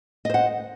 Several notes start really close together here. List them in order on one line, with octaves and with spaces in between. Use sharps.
D#5 C5 F#5